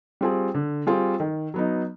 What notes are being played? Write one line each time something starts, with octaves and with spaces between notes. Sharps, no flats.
G3 C4 F4 G#4
D3
G3 C4 F4 G#4
D#3
F#3 B3 D#4